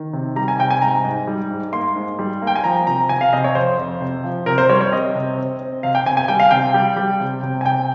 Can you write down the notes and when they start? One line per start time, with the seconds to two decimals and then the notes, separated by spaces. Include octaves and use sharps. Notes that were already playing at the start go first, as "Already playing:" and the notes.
Already playing: D#3
0.13 C3
0.36 G3 A#5
0.48 G#5
0.59 C3 G5
0.70 G#5
0.82 G#2 A#5
1.04 G#2
1.27 G3
1.51 G#2
1.72 A#3 C6
1.96 G#2
2.19 G3
2.42 A#3
2.47 G5
2.56 G#5
2.64 F3 A#5
2.87 C3 A#5
3.09 C3 G#5
3.21 F5
3.33 C3 D#5
3.44 C#5
3.55 F2 C5
3.78 F2
4.01 C3
4.24 F3
4.46 C3 A#4
4.58 C5
4.69 G3 C#5
4.81 C#5
4.92 C4 D#5
5.15 C3
5.37 C4
5.60 C4
5.83 C3 F5
5.95 G5
6.06 C3 G#5
6.17 G#5
6.28 G3 G5
6.40 F5
6.51 C3 G5
6.74 G3
6.97 G3
7.20 C3
7.43 C3
7.61 G#5
7.65 C3 G5